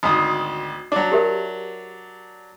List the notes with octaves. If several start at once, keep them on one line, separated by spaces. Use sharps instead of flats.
G#1 D2 D#6
F#3 D4 D6
G4 A#4 E5